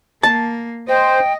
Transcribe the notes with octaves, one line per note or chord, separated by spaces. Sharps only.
A#3 A5
C5 D#5 G5